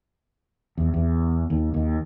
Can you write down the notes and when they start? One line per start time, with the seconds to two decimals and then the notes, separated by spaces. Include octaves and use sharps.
0.77 E2
0.94 E2
1.50 D#2
1.74 D#2